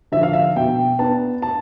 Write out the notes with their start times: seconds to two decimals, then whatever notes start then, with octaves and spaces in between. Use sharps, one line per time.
0.12 D3 F3 E5
0.23 F5
0.33 E5
0.56 B2 G5
0.99 B3 D4 A5
1.42 A5